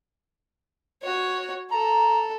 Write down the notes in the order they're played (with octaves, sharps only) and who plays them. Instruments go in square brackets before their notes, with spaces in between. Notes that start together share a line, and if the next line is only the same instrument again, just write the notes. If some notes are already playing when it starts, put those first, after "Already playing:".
[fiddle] F#4 C#5
[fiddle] A4 [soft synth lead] A#5